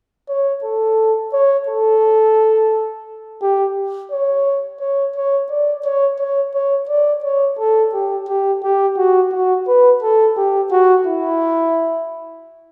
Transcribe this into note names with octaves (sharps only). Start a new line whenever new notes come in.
C#5
A4
C#5
A4
G4
C#5
C#5
C#5
D5
C#5
C#5
C#5
D5
C#5
A4
G4
G4
G4
F#4
F#4
B4
A4
G4
F#4
E4